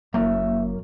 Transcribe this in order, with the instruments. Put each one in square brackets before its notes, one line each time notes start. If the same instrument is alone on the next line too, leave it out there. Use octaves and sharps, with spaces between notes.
[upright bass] F#1 E4 [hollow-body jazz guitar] F#2 [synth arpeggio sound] A#3 [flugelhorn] E5